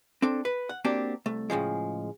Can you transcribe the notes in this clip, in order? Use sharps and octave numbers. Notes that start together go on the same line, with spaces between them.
C4 D4 A4
B4
F#5
A#3 C4 D4 F#4 G4
C2 A3
A2 C#3 F3 G#3